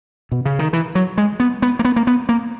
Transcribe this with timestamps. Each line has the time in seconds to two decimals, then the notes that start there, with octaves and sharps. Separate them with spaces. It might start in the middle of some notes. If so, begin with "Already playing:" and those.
0.32 B2
0.46 C#3
0.59 D#3
0.73 E3
0.95 F#3
1.18 G#3
1.40 B3
1.62 B3
1.79 A#3
1.85 B3
1.96 A#3
2.07 B3
2.29 A#3